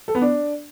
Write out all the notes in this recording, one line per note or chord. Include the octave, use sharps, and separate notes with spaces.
A4
B3
D4